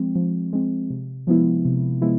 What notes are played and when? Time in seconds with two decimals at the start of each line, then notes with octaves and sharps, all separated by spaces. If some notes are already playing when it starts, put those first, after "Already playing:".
Already playing: F3 G#3 C4
0.15 F3
0.53 G#3 C4
0.90 C3
1.27 F3 G#3 B3 E4
1.65 C3
2.02 F3 G#3 B3 E4